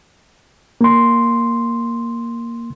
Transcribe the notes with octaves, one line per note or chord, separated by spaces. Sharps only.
A#3 C6